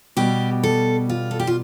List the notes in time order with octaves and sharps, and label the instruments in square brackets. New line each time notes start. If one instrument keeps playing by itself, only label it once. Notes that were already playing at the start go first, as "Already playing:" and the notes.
[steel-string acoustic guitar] B2 G3 G4
A4
F4
A4
G4
F4